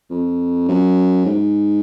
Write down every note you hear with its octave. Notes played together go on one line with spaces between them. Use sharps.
F2
F#2
G#2